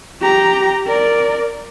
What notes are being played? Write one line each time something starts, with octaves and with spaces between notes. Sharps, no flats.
G4 A#5
A#4 D5